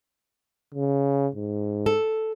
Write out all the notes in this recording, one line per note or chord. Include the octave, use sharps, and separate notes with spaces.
C#3
G#2
A4